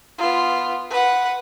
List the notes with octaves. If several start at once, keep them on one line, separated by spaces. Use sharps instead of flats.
B3 F4
B4 F#5